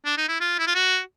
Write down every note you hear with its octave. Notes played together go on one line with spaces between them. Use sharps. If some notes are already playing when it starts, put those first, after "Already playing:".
D4
D#4
E4
F4
E4
F4
F#4